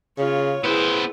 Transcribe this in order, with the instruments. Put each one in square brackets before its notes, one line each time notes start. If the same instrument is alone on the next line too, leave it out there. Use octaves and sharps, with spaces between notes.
[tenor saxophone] C#3 [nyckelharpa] F4 C#5
[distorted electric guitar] B3 C5 [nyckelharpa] E4 G#4 [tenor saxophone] B4